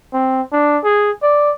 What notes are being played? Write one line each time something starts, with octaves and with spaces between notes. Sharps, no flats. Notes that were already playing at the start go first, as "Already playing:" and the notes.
C4
D4
G#4
D5